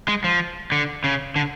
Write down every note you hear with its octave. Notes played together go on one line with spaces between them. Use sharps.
G#3
F3
D3
C#3
D3